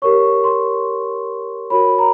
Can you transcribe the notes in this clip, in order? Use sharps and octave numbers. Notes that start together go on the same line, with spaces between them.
G4 A#4 C#5 C#6
C6
F#4 A#4 C#5 B5
A#5